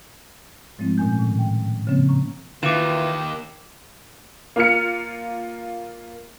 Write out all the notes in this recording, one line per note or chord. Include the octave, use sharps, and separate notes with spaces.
G#2 F3 G#3 A3 C4 E4
A#2 C#4 G#5 G6
A2 D#3
G5
C#3 F3 G3 A#3 C4 C#4
A#5 C#6
D#2 D#3 E3 F4 D6 E7
A#3 F4 F6 C#7